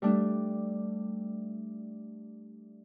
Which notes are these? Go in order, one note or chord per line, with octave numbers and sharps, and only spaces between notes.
G3 A3 D4